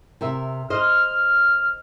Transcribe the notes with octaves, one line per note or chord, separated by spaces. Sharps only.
C3 A#4 E5
C5 D#5 F6